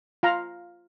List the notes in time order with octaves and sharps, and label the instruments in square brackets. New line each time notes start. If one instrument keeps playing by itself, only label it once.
[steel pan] F4 F5 A#5